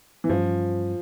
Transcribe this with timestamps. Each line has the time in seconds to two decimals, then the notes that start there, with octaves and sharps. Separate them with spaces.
0.24 E3
0.29 G2 F3 G3 C#4